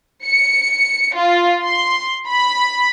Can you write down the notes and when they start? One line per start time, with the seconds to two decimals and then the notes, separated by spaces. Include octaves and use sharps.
0.25 C#7
1.15 F4
1.63 C6
2.28 B5